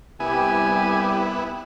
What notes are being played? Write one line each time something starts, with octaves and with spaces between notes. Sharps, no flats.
C2 B3 E4 G4 G#5